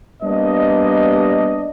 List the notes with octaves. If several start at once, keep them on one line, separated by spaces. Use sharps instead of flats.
G3 A#3 B3 D4 D#5